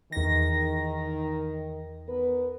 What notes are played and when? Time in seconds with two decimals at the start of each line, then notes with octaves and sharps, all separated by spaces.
0.12 E2 D#3 A#6
2.08 B3 A#4 B4